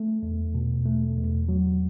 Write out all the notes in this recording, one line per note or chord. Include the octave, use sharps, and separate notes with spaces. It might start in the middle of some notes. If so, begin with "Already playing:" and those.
Already playing: A3
E2
B2
A3
E2
F#3